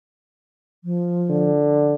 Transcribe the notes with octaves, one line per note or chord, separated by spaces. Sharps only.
F3
D3